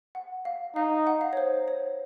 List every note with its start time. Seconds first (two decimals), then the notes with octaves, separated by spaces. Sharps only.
0.15 F#5
0.45 F5
0.76 D#4 F5
1.07 F#5
1.21 F5
1.33 C#5
1.37 C5
1.68 C#5